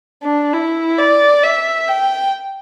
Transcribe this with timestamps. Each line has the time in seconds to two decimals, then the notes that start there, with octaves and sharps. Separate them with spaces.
0.23 D4
0.53 E4
0.98 D5
1.43 E5
1.89 G5